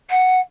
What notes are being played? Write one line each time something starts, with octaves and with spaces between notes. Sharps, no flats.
F#5